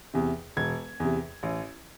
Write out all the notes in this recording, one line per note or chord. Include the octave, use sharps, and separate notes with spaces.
E2 C3
E1 G#6
E2 C3
A1